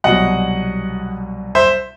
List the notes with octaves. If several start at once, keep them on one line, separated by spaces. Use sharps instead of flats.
C2 B2 F#3 D#5 F#5
C5 E5